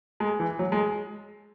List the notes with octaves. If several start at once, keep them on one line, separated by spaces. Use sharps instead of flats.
G#3
E3
F#3
G#3